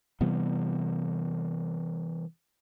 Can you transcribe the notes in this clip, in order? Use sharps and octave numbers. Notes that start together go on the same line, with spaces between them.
C3 E3 G3 B3